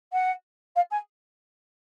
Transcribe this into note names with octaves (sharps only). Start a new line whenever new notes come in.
F#5
F5
G#5